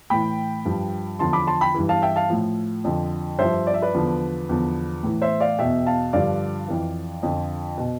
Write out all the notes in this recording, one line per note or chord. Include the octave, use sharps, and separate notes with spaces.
A2 E3 G5 B5
G2 F3
E2 D3 F3 A5 C6
B5 D6
A5 C6
G5 B5
G2 E3
F5 A5
E5 G5
F5 A5
A2 F3
F2 D3 F3
G2 F3 C5 E5
D5
E5
B4 D5
E2 D3 F3
E2 D3 F3
A2 E3
C5 E5
D5 F5
E2 B2 E5 G5
F5 A5
G2 D3 F3 D5 F5
F2 E3
F2 D3 F3
B2